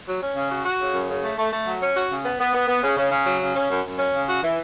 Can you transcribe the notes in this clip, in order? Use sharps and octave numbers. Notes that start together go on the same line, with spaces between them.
F#3
C#4
C#3
F#4
F#4
C#3
F#2
C#3
A3
A3
A3
F#3
C#4
F#4
C#3
B3
B3
B3
B3
C#3
C#3
C#3
F#3
C#3
C#4
F#2
F#2
C#4
C#3
F#4
E3